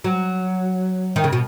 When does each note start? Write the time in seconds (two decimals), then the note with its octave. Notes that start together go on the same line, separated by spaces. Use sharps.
0.04 F#3
1.16 D#3
1.24 C#3
1.33 B2